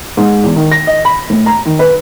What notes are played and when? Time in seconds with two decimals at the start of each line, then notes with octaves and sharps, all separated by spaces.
0.17 G#2
0.44 E2
0.56 D#3
0.72 A#6
0.87 D#5
1.05 B5
1.30 A2
1.46 A#5
1.66 D#3
1.79 B4